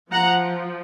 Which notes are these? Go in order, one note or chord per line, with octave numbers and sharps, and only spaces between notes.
F3 F#5 A#5